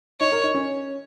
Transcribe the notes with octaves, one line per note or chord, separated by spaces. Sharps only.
D#4 C#5
A#4
D#4
C#4